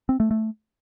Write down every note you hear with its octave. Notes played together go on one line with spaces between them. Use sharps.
C4
A3
A3